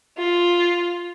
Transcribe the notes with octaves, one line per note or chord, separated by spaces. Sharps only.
F4